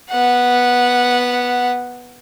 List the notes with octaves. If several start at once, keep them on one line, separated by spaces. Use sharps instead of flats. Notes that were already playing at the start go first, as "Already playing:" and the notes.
B3 F#5